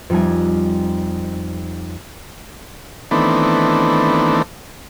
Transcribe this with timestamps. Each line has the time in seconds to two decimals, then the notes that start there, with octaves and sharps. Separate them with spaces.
0.10 F2 G3 D#4 G#5
3.11 D#3 E3 A3 B3 C4 D4